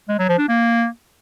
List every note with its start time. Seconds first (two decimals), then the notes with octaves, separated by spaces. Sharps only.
0.09 G#3
0.19 F#3
0.29 F3
0.39 D4
0.48 A#3